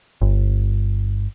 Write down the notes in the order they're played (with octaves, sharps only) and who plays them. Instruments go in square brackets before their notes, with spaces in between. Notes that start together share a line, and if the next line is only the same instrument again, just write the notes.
[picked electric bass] G1